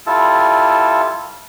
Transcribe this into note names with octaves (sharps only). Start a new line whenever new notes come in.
G3 E4 F4 A4